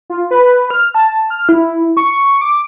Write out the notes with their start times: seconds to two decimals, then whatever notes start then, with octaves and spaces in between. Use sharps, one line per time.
0.10 F4
0.31 B4
0.70 F6
0.95 A5
1.30 F6
1.49 E4
1.97 C#6
2.41 D6